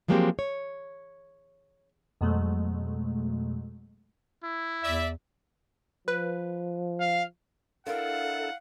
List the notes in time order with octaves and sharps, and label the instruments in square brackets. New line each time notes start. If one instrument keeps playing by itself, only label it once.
[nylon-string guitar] F3 F#3 G#3 A#3 C4 G4
C#5
[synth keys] F2 B2 F#3 G#3 A3
[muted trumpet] E4
[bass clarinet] E2 [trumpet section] D5 E5
[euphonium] F3 [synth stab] B4
[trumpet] F5
[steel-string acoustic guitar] D4 E4 A#4 [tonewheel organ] A4 [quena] F5 [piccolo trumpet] F#5